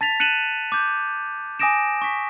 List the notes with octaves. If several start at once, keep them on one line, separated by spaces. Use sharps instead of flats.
A5 A6 B6 F7
F#6 C#7 D#7 E7 F#7
D6 G6
G#5 D6 D#6 A#6 D7 E7
C#6 B6